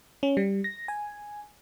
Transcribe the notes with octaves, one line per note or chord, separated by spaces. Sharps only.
C#4
G3
A#6
G#5